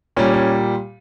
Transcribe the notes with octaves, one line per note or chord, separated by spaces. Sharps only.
A#2 G3 C#4
C#4